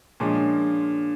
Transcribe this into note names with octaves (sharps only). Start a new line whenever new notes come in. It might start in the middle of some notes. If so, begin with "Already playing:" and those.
A#2 F3 G#3 C#4 D4